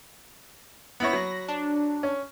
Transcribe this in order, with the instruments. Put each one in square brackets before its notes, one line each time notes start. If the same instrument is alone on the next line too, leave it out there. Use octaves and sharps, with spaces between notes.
[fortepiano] B3 E4 C#5 [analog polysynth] B5 A#6
[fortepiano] F#3
[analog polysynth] D4
[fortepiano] C#4